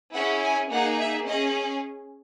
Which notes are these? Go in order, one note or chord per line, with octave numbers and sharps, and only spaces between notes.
C#4 E4 G#4 F#5
G#5
A#3 D#4 G#4 F#5
E5
C#4 G#4 D#5